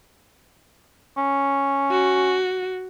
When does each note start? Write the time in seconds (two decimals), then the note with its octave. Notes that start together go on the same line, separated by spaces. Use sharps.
1.17 C#4
1.91 F#4